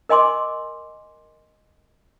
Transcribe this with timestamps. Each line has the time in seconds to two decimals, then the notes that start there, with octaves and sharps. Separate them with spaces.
0.09 A#4 D#5 G#5 C6 D6